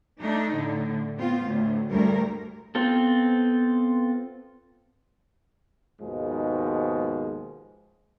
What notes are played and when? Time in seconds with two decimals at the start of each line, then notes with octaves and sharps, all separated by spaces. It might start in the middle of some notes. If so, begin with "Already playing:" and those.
0.21 A3 D4 D#4
0.54 A2 D3
1.16 B3 C4 F4
1.46 D2 A2
1.90 D2 G2 G3 A3 A#4
2.75 B3 C4 F4 A4
6.00 D#2 G#2 B2 F3 G#3